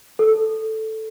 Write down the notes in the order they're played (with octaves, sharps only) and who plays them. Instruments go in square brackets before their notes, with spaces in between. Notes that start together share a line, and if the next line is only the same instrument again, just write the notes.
[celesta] A4